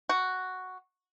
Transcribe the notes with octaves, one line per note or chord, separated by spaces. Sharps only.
F#4